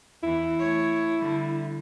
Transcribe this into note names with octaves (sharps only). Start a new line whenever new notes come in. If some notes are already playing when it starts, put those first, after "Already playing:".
E2 E3 E4
A3 C#5
D3 G3